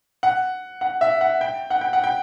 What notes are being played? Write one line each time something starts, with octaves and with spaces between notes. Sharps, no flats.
F#5
F#5
E5
F#5
G5
F#5
G5
F#5
G5